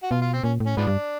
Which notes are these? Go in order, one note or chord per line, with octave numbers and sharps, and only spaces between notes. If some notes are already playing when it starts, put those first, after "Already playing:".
F#4
B2 F4
F4
C4
A#2 C#4
A2
C#4
G#2 F3 B3 D4
G2